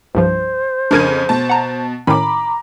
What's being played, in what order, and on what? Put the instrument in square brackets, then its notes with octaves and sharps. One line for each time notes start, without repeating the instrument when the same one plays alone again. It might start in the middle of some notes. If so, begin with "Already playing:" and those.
[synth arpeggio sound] C2 G2 F3 [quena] C5
[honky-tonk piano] F2 C#3 D#7 [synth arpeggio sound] D4 A#4 G#6
[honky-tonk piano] B2 A5
[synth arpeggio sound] F#5 A#5
[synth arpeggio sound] A2 D#3 C#4 [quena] A#5 [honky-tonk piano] B5 D6